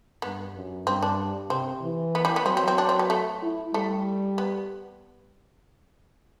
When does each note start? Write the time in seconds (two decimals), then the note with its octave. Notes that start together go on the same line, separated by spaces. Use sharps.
0.22 G2 B3
0.55 F#2
0.86 G2 C4
1.03 D4
1.50 C3 C4
1.82 E3
2.15 B3
2.25 G3
2.36 B3
2.46 F#3 C4
2.57 C4
2.68 C4
2.78 D4
2.89 C4
2.99 B3
3.10 A3
3.42 E4
3.74 G3 A3
4.38 B3